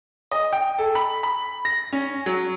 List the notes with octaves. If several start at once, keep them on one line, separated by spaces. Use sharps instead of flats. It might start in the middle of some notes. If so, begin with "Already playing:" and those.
D#5
G5
A4
B5
B5
A#6
C#4
F#3